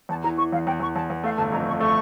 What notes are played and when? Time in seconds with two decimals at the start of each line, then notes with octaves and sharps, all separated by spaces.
0.09 E2 A5
0.24 E3 A#5
0.38 E3 C#6
0.52 E2 F5
0.67 E2 G5
0.80 E2 C#6
0.95 E2 A5
1.10 E2
1.24 A3 F5
1.38 G1 A5
1.52 F2 A#5
1.66 G1 C#6
1.80 A3 C#6